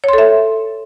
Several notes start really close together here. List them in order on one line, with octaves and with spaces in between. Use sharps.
C#5 C6 A4 E5